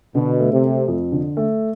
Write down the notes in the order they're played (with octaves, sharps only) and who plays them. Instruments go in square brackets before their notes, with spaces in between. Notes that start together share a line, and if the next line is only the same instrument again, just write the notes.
[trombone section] B2 [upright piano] D3
[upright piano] A3
[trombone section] C3
[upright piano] A3
F2
D3
A3